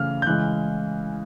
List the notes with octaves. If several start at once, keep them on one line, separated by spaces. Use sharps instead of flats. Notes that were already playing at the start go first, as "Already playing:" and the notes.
Already playing: C#3 E3 A3 F6
G6
C#3 E3 G#3 F#6